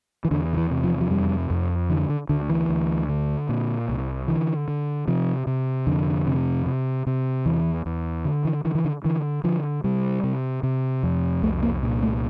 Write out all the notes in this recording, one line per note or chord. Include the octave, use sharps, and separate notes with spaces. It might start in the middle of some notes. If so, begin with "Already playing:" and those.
E3
E2 D3
D3
E3
C3
F3
F3
F2 G3
F2
D3 E3
D3
D2 D3
E3
D2
D3
A#2
C2
D3 E3
D3
C3 F3
C3
F2 D3
C3
C3
C3
E2 E3
E2
D3
E3
D3 E3
E3
D3
D3 E3
D3 F3
C3 G3
C3
C3
F2
C2 A3
A#3
A#2
A3